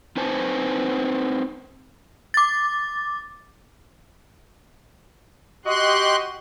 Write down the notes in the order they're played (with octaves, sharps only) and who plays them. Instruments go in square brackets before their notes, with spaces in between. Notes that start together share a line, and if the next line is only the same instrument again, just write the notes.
[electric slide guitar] C4 D#4 B4 C5 G#5 A5
[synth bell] D6 A6
[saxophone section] F#4 D#5 [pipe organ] G4 C6 F#6